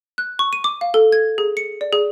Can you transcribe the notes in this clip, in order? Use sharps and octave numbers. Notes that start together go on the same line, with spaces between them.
F#6
C#6
D#7
D6
F5
A4
G#6
G#4
C#7
D5
G#4